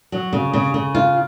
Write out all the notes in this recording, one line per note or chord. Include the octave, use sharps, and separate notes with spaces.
F#3
C#3
C#3
C#3
F4